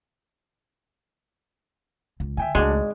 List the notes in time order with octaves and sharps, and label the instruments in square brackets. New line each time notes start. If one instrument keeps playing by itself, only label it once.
[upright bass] C#2
[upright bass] D3 [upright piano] E5 G5 G#5
[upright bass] C#2 A3 [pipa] G#3 [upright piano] D4 F#4
[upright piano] G#1